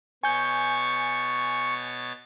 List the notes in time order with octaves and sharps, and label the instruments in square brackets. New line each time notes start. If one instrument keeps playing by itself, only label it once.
[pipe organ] B2 C#5 A6 [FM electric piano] G#5 G6 [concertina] C#6